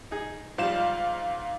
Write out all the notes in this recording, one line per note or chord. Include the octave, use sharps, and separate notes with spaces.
D#4 G#4
G#2 F3 G3 F5 E7